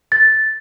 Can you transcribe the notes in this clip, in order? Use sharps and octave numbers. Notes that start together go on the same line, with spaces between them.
A6